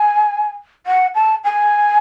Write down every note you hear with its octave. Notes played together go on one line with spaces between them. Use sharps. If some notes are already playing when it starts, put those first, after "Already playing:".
Already playing: G#5
F#5
A5
G#5